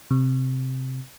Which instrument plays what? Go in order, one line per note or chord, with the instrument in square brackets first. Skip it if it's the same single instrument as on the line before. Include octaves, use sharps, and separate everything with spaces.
[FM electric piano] C3